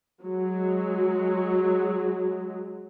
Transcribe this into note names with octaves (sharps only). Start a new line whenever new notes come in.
F#3 G#3